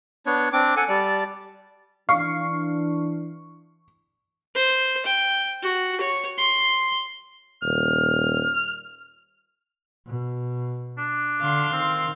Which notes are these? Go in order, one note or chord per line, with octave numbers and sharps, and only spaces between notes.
B3 D4 C#5
C4 D4 D6
A4 F#5 G#5
G3 D5 A5
E3 D4 F5 C#6
C5
G5
F#4
C#5
C6
D#1 F6
B2
D4
D3 F5 C6
D#3 C4